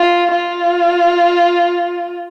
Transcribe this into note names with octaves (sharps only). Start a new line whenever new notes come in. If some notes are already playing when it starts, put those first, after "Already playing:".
Already playing: F4
F4